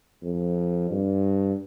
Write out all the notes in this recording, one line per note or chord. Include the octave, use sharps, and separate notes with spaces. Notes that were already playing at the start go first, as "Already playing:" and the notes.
F2
G2